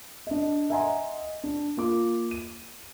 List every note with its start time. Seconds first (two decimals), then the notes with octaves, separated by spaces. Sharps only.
0.27 D4 D#5
0.70 D#5 E5 F#5 G#5 A#5 C6
1.44 D4
1.77 A#3 F4 D6
2.31 D#7